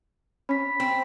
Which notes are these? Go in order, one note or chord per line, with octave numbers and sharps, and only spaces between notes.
C#4 B5 B6
C4